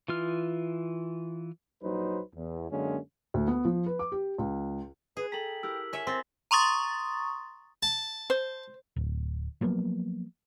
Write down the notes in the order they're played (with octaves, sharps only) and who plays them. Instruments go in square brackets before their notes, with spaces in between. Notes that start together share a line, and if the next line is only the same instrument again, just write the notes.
[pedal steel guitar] E3 F4 F6
[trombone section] A#1 F#3 D#4 B4 C5
E2
F#2 D3 G#3 A#3 C#4
[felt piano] D2
B3
F3
B4
D6
G4
C#2
[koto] G#4 [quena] B4
[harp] A4 A#5 [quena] G5 [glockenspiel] B6 F#7
[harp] E4 G4 A#4 [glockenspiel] E6
[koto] C#5 E5 [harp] G#5
[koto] C4 [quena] C5 [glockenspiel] C6 A6 A#6
[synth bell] A#5 C6 C#6 D#6 A6
[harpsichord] A5
[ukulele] C5
[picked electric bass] D1
F3 F#3 A#3 B3